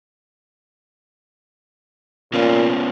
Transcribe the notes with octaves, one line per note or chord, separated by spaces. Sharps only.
A#2 B3 C#4 F4